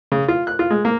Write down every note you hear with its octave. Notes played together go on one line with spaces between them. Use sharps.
C#3
F4
F#6
F4
G#3
A#3